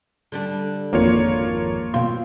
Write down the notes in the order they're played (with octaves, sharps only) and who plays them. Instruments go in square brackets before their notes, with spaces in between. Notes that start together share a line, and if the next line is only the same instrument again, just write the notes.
[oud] D3 G3 D4
[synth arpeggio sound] G#1 F2 [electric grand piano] A#3 F4 C#5
[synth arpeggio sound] B2 F4 [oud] C4